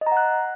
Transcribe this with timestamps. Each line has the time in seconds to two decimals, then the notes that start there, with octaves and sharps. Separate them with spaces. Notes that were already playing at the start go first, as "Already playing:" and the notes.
0.01 D#5
0.06 A#5
0.12 F#5
0.17 F#6